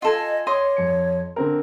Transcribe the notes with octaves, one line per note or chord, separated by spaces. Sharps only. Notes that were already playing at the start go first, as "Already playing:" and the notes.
F4 A4 D#5 G#5
C#5 D#5 C6 D6
F2 C#7
D3 C4 A#4